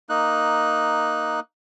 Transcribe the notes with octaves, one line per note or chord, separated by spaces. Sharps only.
A#3 D#4 F#6